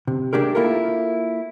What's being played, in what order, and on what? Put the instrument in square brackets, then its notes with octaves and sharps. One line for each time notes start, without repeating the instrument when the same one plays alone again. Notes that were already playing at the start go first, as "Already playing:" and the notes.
[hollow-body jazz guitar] C3
A3 D4 G4 G#4 A#4
A#3 E4 F4 A4 A#4